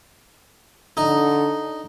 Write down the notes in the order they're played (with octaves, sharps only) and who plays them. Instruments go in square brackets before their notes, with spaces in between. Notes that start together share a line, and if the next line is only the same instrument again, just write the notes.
[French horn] D3 [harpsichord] D#4